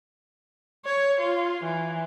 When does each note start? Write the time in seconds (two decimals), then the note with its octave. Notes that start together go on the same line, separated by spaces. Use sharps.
0.85 C#5
1.21 F4
1.64 E3